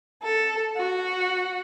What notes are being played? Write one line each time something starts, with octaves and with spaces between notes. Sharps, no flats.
A4
F#4